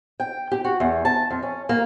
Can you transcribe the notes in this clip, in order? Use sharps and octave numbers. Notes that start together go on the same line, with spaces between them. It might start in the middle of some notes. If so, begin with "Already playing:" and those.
G5
G4
F#4
E2
A5
F2
C#4
A#3